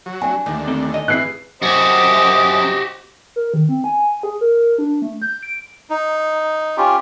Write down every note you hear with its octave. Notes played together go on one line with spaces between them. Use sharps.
F#3
D4 G#5
D#2 D3 A3
C4 A4
C#4 D#5
E3 G#4 B4 F#6 C7
F#2 F#4 G4 C5 D#5 D6
A#4
D#3
C4
G#5
G#4
A#4
D4
A3
G6
D7
D#4
C#4 F4 G4